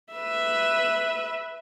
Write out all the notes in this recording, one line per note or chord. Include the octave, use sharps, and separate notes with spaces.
B4 E5